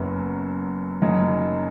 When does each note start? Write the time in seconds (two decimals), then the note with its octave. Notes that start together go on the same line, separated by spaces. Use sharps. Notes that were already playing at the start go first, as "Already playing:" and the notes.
Already playing: F#1 F#2 F#3 B3
1.02 F#1 F#2 F#3 D#4